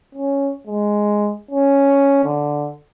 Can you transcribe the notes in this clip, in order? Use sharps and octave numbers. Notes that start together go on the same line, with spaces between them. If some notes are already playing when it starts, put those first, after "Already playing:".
C#4
G#3
C#4
D3